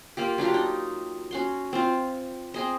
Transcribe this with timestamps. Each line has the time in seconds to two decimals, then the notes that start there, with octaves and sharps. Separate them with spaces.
0.17 A#3 F4 G4
0.38 F#3 D4 F4 G4
0.54 D#4
1.31 C#4 F#4 C6
1.73 C4 F4
2.54 C4 G#4 D#5